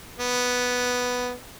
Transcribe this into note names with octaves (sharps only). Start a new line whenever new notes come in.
B3